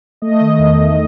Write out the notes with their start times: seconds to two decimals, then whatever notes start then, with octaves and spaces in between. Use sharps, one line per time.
0.22 A3 D#5
0.41 D#3
0.59 E2
0.78 E2